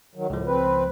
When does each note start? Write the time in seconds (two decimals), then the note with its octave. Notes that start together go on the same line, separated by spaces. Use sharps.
0.16 D#3 F#3
0.30 C#2 A2 F3
0.46 C4 B4